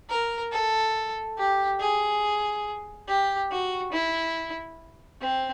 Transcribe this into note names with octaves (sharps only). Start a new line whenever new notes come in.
A#4
A4
G4
G#4
G4
F#4
E4
C4